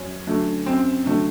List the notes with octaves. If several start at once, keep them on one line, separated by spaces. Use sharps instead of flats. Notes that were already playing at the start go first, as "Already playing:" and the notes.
Already playing: F#2 C#4
D3 F#3 A3
F#2 C4
D3 F#3 A3